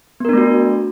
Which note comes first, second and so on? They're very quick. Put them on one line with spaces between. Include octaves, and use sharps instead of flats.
B3 A#4 D4 A3 F#4